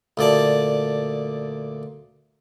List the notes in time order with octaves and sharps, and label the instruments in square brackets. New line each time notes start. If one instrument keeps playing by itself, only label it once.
[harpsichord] D2 A#2 D5 A5